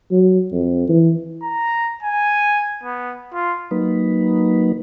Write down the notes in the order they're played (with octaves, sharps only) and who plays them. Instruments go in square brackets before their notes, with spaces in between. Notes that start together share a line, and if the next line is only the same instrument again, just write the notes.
[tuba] F#3
F2
E3
[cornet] A#5
G#5
B3
F4
[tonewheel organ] F#3 A#3 D#4 B4